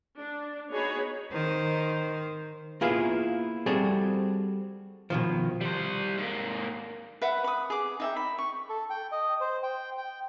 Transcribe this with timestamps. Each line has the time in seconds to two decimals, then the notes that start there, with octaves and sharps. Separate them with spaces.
0.16 D4
0.69 B3 D#4 F#4 G#4 C#5 B5
1.32 D#3 C5
2.81 A#3 B3 E4 F4 G#4 B4
3.66 G3 C4 F#4 G#4 A4
5.10 B2 D#3 F3
5.61 G3 C5
6.18 G#2 A#3
7.22 B4 E5 F#5
7.44 B5 D#6
7.70 G#4 D6
8.00 D#4 E5 G5
8.16 B5
8.38 C#6
8.69 A4
8.90 G5
9.12 D#5
9.41 C5
9.63 G5
9.97 G5